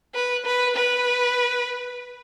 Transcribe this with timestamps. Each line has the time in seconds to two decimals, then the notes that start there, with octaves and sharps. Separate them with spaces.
0.15 B4
0.46 B4
0.76 B4